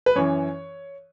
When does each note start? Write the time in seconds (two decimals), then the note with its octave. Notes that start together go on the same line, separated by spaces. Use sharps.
0.06 B4
0.15 F#2 E3 C#5